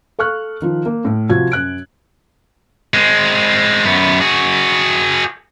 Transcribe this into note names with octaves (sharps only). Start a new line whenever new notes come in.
A4 F5 C#6 F6 F#6
D#3 F3
A#3
A2
C3 F3 F#4 G#6
F#2 F#6 D7
G#3 C4
F#2 B3
F#4 G#4